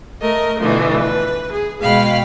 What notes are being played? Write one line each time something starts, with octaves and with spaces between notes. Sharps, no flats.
A3 A#4 D#5
B2 D3 E3 F3 A3
B4
G#4
B2 G#3 F5 G5 B5